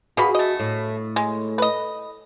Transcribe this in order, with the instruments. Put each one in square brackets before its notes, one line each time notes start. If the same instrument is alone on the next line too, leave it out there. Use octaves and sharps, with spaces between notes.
[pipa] B2 A#3 B5 [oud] F#4 G#4
[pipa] A3 D#5
[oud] A2
[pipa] G#3
B4 D#5